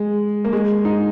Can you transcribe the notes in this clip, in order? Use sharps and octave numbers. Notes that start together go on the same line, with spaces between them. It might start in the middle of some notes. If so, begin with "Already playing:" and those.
Already playing: G#3
A#3
G#3
D#4